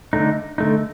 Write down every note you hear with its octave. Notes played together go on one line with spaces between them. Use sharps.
D3 A3 D#4
D3 A3 D#4